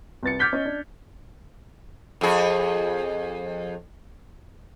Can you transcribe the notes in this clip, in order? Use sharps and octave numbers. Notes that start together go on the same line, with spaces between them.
C2 B4 A6 C#7
D6 F6 G6 G#6 B6 G7
C#4 D#5
D4
F2 G#4